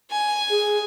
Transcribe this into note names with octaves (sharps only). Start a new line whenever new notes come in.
G#5
G#4